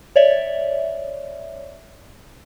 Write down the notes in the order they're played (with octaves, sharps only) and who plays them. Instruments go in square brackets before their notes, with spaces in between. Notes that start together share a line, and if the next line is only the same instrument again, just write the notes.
[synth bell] C#5 D5 E5